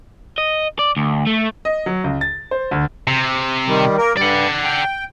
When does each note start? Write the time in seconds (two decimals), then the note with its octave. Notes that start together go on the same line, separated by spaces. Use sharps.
0.38 D#5
0.79 D5
0.97 D2
1.27 A3
1.65 D#5
1.86 F#3
2.04 C#2
2.21 A6
2.51 C5
2.71 D2
3.07 C3
3.68 D#3 G3
3.98 A#3 A#4
4.17 G2 G3 D5 F#5
4.64 G5